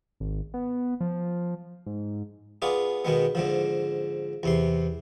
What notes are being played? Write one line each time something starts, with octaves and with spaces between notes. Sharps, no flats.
G#1
B3
F3
G#2
B3 F4 G#4 D5
B2 D#3 G#3 B3
G#2 D3 F3
E2 C3 C6